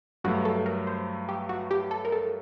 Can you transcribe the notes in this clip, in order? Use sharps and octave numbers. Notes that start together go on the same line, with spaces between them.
G2 F#3 A3 F#4
A4
A#4
C5
G4
F#4
G4
A4
A#4
A4